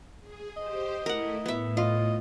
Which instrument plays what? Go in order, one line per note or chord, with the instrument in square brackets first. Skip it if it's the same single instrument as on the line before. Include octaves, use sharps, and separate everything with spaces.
[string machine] G#4
[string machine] G4 C5 [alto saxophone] D#5
[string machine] A3 E4 [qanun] A#4 F#5
[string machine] A2 [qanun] B3 E5
[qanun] F4 [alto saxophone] D#5